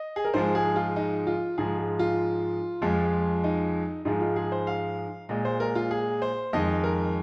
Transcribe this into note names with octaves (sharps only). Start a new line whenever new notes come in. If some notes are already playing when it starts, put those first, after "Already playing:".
Already playing: D#5
G#4
A#4
G#2 F3 G#3 C5
G#4
F4
D#4
F4
G#2 F3 G#3 G#4
G#4
F4
F2 F3 G#3
D#4
G#2 F3 G#3 D#4
F4
G#4
C5
F5
A#2 G#3 D#5
C5
A#4
F4
G#4
C5
F2 D#3 G#3 D#5
A#4